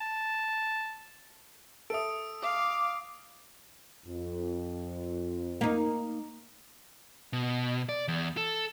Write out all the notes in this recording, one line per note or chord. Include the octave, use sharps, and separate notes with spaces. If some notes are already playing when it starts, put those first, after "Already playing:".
A5
A4 E5 D#6 D7
F5 D6
F2
A#3 D#4
B2
D5
E2
A4